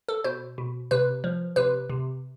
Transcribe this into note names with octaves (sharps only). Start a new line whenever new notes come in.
A4
B2 C5
B2
C3 B4
F3
C3 B4
C3